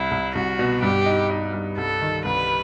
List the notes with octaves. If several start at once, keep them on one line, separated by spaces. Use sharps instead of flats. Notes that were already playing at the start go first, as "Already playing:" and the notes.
Already playing: C2 E4
C2
C2 F#4
B2
G2 G4
D#4
D#4
G2
C2 A4
D#3
C2 B4